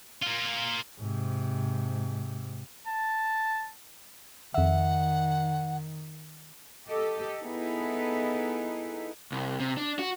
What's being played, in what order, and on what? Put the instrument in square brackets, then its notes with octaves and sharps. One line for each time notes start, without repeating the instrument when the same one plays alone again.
[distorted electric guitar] A#3 F4
[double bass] G#2 C3
[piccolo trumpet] A5
[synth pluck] F2 E5 [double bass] D#3 [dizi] F#5
[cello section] G4 A4 D#5
B3 D#4 E4 G#4 A4 B4
[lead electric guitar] C2
C3
D4
F#4